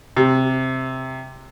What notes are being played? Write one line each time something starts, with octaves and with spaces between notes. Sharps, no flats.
C3